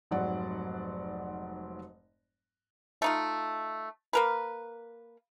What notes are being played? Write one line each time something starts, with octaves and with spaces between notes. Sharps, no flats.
F1 G#2 F#3 D5 F#5
A3 D#4 F4
A#3 A#4 B4